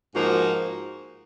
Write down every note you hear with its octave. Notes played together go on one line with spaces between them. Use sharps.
G#2 F3 A#3 D#4 F#4